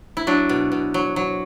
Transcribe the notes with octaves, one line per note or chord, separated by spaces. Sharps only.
E4
F#3 D4
B2
B2
F#3
F#3